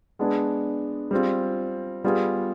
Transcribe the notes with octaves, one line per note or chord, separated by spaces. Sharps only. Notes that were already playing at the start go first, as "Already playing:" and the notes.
G#3 B3 D4 G#4
G3 C4 F4 G#4
G3 B3 F4 G#4